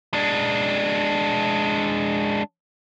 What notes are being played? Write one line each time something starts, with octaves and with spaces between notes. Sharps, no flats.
G#3 D4